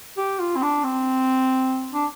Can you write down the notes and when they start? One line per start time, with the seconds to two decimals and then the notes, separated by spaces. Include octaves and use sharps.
0.17 G4
0.40 F4
0.56 C4
0.62 D4
0.84 C4
1.93 D4